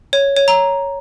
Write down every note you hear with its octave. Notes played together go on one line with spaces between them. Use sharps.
C#5
C#5
A#5